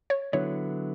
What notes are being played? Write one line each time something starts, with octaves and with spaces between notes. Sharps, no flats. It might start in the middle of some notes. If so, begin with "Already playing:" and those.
C#5
D3 F#3 B3 E4 C#5